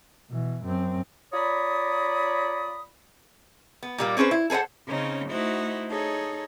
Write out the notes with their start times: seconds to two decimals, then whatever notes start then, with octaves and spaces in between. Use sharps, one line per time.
0.30 B2 E3
0.63 F#2 C4
1.33 F4 C#5 D5 A#5 B5 D#6
3.83 B3
3.98 A#2 G3 A#3
4.17 C4 C#4 G#4 B4 C5
4.31 E4
4.50 G#4 A4 B4 C5 F#5
4.87 C#3 C4 C#4 D#4
5.29 A3 D#4 E4 F#4 C5
5.89 D#4 G#4 A4 C#5